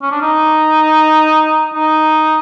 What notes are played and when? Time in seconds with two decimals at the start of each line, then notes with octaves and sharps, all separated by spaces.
0.02 C#4
0.12 D4
0.22 D#4
1.74 D#4